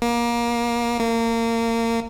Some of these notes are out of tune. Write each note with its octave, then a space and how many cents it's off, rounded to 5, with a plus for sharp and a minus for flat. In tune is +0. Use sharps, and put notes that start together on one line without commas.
A#3 +25
A#3 -25